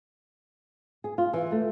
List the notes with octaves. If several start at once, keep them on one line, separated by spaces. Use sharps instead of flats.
G#4
F4
E3
A3